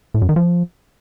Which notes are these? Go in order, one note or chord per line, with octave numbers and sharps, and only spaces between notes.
A2
F#2
D#3
F3